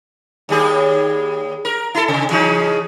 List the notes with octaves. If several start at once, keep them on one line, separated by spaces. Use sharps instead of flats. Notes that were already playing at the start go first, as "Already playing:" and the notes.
D#2 G3 G#4
A#4
E4 A4
C3
C#3 E3 D#4